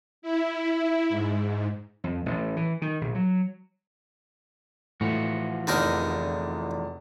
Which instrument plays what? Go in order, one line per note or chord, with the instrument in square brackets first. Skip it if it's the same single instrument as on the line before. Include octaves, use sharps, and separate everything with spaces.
[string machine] E4
G#2
[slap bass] F2
A1
E3
D#3
A#1
F#3
[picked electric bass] A2 [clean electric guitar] E3 F3 F#4
[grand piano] F1 E2 [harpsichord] D3 D#4 A#4